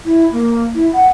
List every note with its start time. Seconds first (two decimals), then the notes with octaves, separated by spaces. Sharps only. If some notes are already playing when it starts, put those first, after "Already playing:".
0.05 E4
0.32 A#3
0.75 E4
0.93 F#5